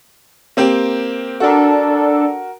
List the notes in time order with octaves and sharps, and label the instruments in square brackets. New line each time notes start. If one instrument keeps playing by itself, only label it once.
[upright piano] A#3 C4 G4
[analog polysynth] D4 A4 [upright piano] F#4 A#4